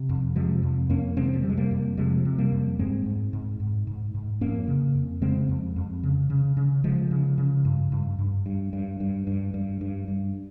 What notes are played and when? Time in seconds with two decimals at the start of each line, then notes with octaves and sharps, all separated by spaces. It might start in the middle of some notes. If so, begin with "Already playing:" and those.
Already playing: C3
0.09 F2
0.36 C3 F3 G#3
0.63 F2
0.90 F2 A#3 C#4
1.17 C3 G#3 C4
1.25 D#3
1.33 F3
1.41 C3 G3
1.49 G#3
1.57 G3 A#3
1.71 F2
1.97 C3 F3 G#3
2.25 C3
2.38 G3 A#3
2.52 F2
2.79 G#2 G#3 C4
3.06 G#2
3.33 G#2
3.60 G#2
3.87 G#2
4.15 G#2
4.41 F2 A#3 C#4
4.68 C#3
4.95 F2
5.22 C#3 G#3 C4
5.49 F2
5.76 F2
6.03 C#3
6.30 C#3
6.57 C#3
6.84 C#3 F3 G#3
7.11 C#3
7.38 C#3
7.65 G2
7.92 G2
8.19 G2
8.46 G2
8.73 G2
9.00 G2
9.27 G2
9.54 G2
9.81 G2
10.08 G2